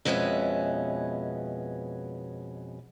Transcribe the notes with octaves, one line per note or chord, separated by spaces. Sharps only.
F2 B2 G#3 B3 C#4 E5